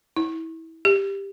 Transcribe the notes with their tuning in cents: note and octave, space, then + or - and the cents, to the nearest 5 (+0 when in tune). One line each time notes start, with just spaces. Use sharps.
E4 -25
G4 +10